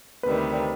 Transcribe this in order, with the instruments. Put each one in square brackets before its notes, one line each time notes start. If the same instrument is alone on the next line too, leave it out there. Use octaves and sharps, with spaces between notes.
[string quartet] D2 C3 D#3 G3 [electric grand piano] B4